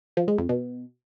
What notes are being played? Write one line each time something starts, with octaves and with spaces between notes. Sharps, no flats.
F3
G#3
F2
B2